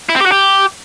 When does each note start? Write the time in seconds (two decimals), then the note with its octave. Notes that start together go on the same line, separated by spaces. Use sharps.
0.09 E4
0.15 C4
0.20 G4
0.26 F#4
0.32 G4